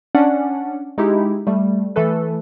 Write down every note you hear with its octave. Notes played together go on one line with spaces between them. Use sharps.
C#4 D4 D5 F#5
G#3 D#4 E4 G4
G3 A3
E3 A3 A4 B4